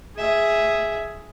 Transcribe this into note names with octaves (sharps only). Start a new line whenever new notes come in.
G#4 E5